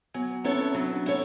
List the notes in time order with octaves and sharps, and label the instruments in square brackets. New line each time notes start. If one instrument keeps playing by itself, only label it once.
[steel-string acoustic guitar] F#3 [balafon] B3
[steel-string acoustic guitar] B3 E4 A4 C#5 [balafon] C#4
[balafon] C4
C#4
[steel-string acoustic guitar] F#3 [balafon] D4
[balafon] D4
[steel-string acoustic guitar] B3 E4 A4 C#5